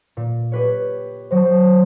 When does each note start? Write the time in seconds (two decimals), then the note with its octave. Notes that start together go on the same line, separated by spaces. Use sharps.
0.17 A#2
0.52 G4 B4 C#5
1.31 F#3 C5